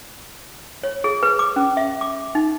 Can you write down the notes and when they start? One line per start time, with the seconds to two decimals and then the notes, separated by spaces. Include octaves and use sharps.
0.83 C#5
1.04 G#4
1.23 B4
1.39 D6
1.56 C#4
1.77 E5
2.01 D6
2.35 D#4